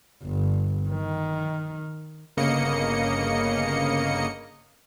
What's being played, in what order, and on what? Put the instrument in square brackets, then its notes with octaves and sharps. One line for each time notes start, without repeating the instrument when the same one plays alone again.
[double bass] G1
D#3
[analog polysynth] G1 C#3 A#3 D#5 C#7